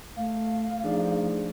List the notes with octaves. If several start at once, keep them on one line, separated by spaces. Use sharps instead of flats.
A3 F5
F3 A3 D4 D#4 G#4 D5